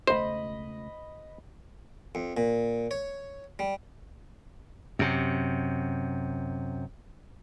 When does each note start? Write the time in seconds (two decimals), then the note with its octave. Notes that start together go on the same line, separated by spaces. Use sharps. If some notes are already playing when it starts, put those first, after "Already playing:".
0.07 E1 C#2 A3 C5 D#5 B5
2.15 F2
2.37 A#2
2.91 C#5
3.59 G3
4.99 F#2 C3